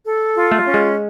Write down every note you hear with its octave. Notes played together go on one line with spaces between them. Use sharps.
A4
F4
A3
C#4
G#3